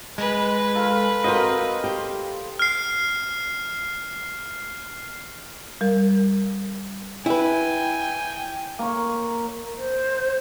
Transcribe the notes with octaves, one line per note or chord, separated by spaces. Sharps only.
G#3 B4
F4 A4 A#4
C4 F4 F#4 A#4 C5 D#5
G4 C5
F6 C7
G3 A#4
E4 B4 G5 G#5
A#3 C#5
C5